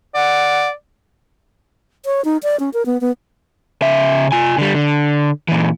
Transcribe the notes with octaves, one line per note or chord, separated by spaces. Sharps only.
D5 F#5
C#5
D#4
D5
C#4
A#4
B3
B3
C#3 E5
F4 G#5
D3 G3
D3
A#2 E3